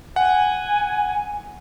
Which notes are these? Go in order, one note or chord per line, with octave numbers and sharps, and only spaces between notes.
F#5 G#5